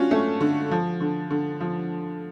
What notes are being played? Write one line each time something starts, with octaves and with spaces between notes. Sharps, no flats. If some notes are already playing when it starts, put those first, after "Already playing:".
Already playing: C#4 D4 F4 F#4
A3 C#4
D3
F3
D3
D3
F3